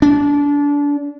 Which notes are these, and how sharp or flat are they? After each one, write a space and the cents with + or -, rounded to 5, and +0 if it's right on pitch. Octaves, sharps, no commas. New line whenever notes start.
D4 -25